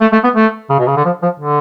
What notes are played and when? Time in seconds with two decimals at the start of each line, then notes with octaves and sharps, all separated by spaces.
0.01 A3
0.13 A3
0.24 B3
0.36 A3
0.70 C#3
0.79 B2
0.87 C#3
0.96 D3
1.05 F3
1.23 F3
1.40 D3